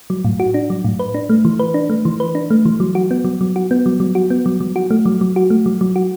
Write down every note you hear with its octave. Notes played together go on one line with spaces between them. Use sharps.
F#3
A2
F#4
D4
F#3
A2
B4
D4
A3
E3
B4
D4
A3
E3
B4
D4
A3
E3
F#3
F#4
B3
F#3
F#3
F#4
B3
F#3
F#3
F#4
B3
F#3
F#3
F#4
A3
F#3
F#3
F#4
A3
F#3
F#3
F#4